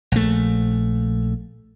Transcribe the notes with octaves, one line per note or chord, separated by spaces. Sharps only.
A#1 A3